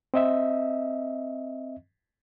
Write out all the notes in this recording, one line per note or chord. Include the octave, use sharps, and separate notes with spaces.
C4 D#5 E5